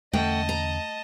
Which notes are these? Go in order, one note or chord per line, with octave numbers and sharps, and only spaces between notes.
E2 D3 A3 C#4 D#5 F#5 G5 A5
A#5